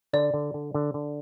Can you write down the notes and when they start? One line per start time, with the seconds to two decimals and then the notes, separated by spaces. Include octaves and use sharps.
0.13 D3 D5
0.34 D3
0.54 D3
0.74 D3
0.94 D3